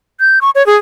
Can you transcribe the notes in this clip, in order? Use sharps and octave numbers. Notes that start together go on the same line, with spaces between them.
G6
C#6
C#5
G#4